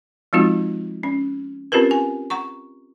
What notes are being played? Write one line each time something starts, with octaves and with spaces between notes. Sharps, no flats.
F3 G#3 C4 D#4 F4 F#4
C#4
C4 C#4 F4 G4 A#4 B4
G#5
F#5 A#5 C#6